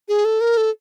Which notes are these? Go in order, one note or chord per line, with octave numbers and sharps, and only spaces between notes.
G#4
A4
A#4
A4